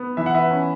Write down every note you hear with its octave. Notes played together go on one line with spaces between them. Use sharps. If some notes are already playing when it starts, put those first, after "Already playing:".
Already playing: B3
E3 E5
F#5
B4 E5
C#4